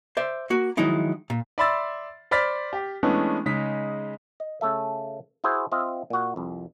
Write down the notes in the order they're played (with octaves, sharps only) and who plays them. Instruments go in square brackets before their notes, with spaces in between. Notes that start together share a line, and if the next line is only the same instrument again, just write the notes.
[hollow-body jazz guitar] C5 D5 E5
A#3 F#4
D#3 F3 F#3 G#3 D#4 E4
A#2
[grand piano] D5 E5 B5 C6 E6 A6
C5 D5 B5 F6 A6 B6
G4
E3 G#3 A3 B3 C#4 D4
C#3 G#3 D#4 B6
[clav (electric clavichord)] D#5
C#3 A3 A4 E5
E4 F#4 G#4 C5
C4 F4 D#5 E5
A#2 F#4
C2 F2